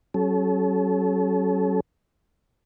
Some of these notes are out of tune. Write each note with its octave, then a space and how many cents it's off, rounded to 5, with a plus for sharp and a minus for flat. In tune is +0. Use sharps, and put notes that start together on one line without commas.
F#3 +30 C#4 -10 A4 -35